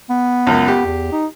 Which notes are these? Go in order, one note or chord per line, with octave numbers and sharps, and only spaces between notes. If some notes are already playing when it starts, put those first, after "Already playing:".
B3
C#2 F#2
G4
E2
D#4